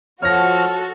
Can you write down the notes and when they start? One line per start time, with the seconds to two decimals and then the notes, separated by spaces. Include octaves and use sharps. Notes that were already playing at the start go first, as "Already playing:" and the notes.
0.23 F3 F#4 A4 C#5 F6 A#6